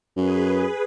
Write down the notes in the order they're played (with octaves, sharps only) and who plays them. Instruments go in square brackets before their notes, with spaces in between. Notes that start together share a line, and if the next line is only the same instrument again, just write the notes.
[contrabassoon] F#2 [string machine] G#4 B4